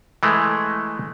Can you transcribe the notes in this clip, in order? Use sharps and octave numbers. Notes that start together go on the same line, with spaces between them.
E3 G#3 A3